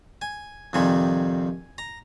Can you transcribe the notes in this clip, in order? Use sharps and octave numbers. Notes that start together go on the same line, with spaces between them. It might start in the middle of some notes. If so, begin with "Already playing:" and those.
G#5
F2 C3 D#3 G3 G#5
A#5